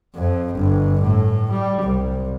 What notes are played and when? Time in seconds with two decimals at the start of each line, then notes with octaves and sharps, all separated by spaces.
0.15 F2
0.55 G1
1.02 A2
1.52 G3
1.82 C2